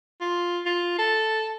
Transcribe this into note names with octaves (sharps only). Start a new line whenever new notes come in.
F4
F4
A4